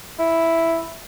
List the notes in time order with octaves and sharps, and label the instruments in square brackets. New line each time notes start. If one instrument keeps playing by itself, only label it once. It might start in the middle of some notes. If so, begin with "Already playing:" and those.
[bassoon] E4